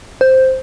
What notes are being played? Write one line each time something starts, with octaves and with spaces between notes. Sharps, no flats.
C5